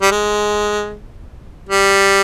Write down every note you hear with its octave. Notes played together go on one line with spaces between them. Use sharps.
G3
G#3
G3